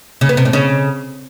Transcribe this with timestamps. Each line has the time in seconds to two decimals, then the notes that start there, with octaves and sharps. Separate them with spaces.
0.21 C#3
0.29 B3
0.37 C3
0.45 A2
0.53 C#3